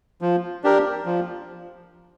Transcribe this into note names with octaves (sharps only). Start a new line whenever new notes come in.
F3
D4 G4 A#4
F3